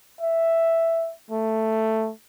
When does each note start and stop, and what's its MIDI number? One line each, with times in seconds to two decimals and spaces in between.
0.21 1.13 76
1.31 2.11 57